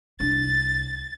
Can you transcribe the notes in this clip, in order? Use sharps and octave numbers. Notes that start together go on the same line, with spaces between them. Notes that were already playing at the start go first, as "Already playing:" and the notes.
C2 D4 A6